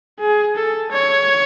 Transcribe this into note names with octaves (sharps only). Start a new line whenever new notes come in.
G#4
A4
C#5